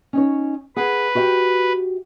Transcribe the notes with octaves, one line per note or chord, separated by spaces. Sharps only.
C#4 D#4 C#5
G#4 B4 F#5
F#4 G4 E5